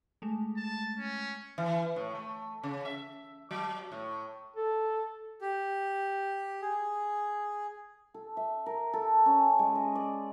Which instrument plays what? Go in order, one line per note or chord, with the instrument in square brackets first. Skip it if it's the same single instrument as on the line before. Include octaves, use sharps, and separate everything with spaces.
[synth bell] G#3 A3
[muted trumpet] A5
C#4
[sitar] E3
A2
A3
C#3
E5
F#3
A2
[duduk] A4
[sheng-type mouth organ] G4
G#4
[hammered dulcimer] A4
E5
A#4
A4
C#4
G#3
D#5
D5